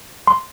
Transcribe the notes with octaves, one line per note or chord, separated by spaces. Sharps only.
C6